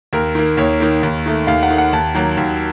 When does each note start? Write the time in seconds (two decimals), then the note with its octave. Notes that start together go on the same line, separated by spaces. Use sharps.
0.13 D#2 A#4
0.35 D#3 A#3
0.57 D#2 C#5
0.80 D#3 A#3
1.03 D#2
1.26 D#3 A3
1.47 D#2 F5
1.63 F#5
1.70 D#3 A3
1.78 F#5
1.93 D#2 A5
2.15 D#3 F#3 A#3
2.37 D#2